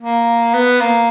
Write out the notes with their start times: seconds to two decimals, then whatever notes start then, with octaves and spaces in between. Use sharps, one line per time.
0.01 A#3
0.54 B3
0.81 A#3